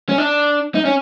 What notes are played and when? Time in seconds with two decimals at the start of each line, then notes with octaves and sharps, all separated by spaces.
0.09 C#4
0.18 D4
0.75 D#4
0.85 C#4